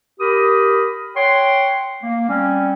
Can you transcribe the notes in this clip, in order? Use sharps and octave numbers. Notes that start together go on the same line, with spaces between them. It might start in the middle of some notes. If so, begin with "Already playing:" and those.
G4 A#4 B5 D#6
C#5 F#5 G5 C6
A#3
G3 C4 C#4